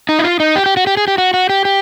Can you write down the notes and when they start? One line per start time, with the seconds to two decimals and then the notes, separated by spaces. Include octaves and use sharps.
0.09 D#4
0.19 E4
0.24 F4
0.40 D#4
0.56 G4
0.66 G4
0.77 F#4
0.87 G4
0.97 G#4
1.08 G4
1.18 F#4
1.34 F#4
1.49 G4
1.65 G4